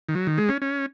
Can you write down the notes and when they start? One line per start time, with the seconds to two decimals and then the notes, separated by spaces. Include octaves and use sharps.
0.09 D#3
0.15 F#3
0.27 D#3
0.38 G#3
0.49 C#4
0.62 C#4